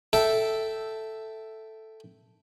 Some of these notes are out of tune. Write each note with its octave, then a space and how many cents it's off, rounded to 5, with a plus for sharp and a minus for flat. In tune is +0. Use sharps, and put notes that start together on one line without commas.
A4 +0 E5 +0 G5 -10